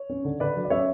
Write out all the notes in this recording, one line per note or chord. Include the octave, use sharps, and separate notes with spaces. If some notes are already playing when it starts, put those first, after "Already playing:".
Already playing: C#5
C#4
D3
D3 B4 D5
F#3
D5
C#4 C#5 E5